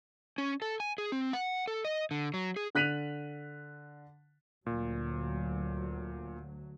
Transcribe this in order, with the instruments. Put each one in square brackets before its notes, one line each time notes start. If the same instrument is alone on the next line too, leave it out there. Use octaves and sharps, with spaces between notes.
[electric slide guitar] C#4
A4
G#5
G#4
C4
F#5
A4
D#5
D3
F#3
G#4
[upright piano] D3 F#6 B6 D#7 F7 F#7
[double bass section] D2 F#3 [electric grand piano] A#2